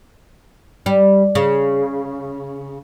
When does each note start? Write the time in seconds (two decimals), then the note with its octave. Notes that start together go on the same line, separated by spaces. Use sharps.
0.86 G3
1.35 C#3